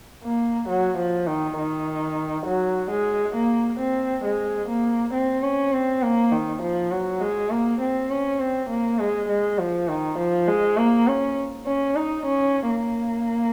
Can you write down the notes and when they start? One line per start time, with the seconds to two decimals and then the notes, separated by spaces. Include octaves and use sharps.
0.24 A#3
0.68 F#3
0.97 F3
1.27 D#3
1.58 D#3
2.46 F#3
2.91 G#3
3.35 A#3
3.80 C4
4.24 G#3
4.69 A#3
5.13 C4
5.43 C#4
5.73 C4
6.03 A#3
6.32 D#3
6.62 F3
6.92 F#3
7.21 G#3
7.51 A#3
7.81 C4
8.10 C#4
8.40 C4
8.69 A#3
8.99 G#3
9.29 G#3
9.59 F3
9.88 D#3
10.18 F3
10.48 G#3
10.77 A#3
11.07 C#4
11.66 C#4
11.96 D#4
12.26 C#4
12.70 A#3